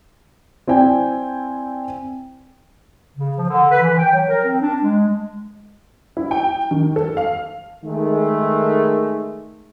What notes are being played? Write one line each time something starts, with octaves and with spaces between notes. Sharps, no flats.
C4 E4 D5 G5 G#5
C#3
F3
D3
B4
E3
G5
F#3
A#4
C4
D4
G#3
E4
G5
D#3
A4
F5
D#3 G#3 A3